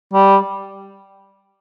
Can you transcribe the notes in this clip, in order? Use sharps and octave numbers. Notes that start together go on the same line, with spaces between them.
G3